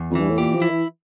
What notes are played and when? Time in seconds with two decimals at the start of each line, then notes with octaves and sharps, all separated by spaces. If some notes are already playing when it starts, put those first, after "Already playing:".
Already playing: E2
0.10 F2
0.15 G2 E3
0.29 A2
0.38 A#2 G4
0.54 F3
0.62 E4
0.70 E3